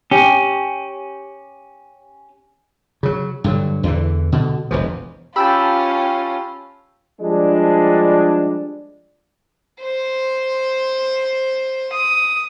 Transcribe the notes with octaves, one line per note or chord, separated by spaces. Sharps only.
C#4 G4
C#3 F#3
G2 D3 F#3
E2 D3 E3
B2 D3
E1 E3 F3
C#4 F4 G4 G5 A5 B5 E6
F3 G3 G#3 D4
C5
D#6